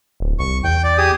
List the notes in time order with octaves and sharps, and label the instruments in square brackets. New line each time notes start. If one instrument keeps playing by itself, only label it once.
[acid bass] D1
[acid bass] C2 [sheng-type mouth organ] C#6
[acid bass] E2 [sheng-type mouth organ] G5
[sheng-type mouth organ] D5
G4 G#4 D#6